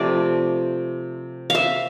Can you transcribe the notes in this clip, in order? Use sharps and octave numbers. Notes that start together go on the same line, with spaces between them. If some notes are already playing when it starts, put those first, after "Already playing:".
Already playing: C3 F3 A3 D5
E5 F5